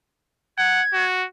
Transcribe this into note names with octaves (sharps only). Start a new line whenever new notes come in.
F#5 G#6
F#4